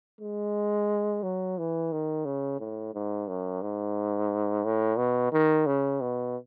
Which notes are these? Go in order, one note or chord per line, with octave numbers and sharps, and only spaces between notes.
G#3
F#3
E3
D#3
C#3
A2
G#2
F#2
G#2
A2
B2
D#3
C#3
B2